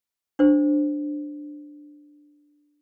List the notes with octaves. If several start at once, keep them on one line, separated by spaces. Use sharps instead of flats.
D4 C5